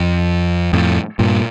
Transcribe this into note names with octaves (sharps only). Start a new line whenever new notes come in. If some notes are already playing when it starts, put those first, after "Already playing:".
Already playing: F2
F2 A2
G2 A#2